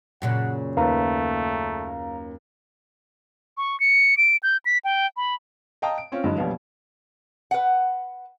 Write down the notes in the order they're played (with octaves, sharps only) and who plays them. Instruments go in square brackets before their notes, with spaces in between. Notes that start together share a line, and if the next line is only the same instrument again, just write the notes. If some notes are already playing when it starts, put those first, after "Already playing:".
[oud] F#2 A#2 C#3 [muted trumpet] F#5
[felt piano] D#2 B4 [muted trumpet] A3 [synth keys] F5 A#5
[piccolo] C#6
C#7
D7
G6
B6
G5
B5
[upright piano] D#5 F5 G5 A5 A#5 D#6
D7
C4 C#4 F4
G2 D3 E3 F#3 G#3 D#4
A#1 B2 F#3 G3 B3 F5
[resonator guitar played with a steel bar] B4 F#5